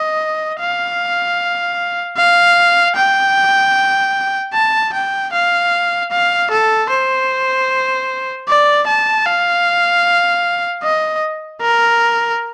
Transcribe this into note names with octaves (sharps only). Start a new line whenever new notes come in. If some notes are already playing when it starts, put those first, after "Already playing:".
Already playing: D#5
F5
F5
G5
A5
G5
F5
F5
A4
C5
D5
A5
F5
D#5
A#4